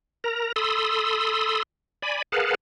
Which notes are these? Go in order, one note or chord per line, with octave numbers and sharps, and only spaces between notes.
A#4 A#5
A4 B5 C6 D#6 E6
D5 G#5 B5
G#4 A#4 B4 F5 F#5 A5